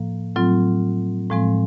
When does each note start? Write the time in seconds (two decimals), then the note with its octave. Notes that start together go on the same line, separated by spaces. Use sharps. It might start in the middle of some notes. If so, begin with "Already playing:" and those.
Already playing: A2 F3 A#3
0.35 A2 F#3 A3 C4 F4
1.30 A2 F3 G#3 C4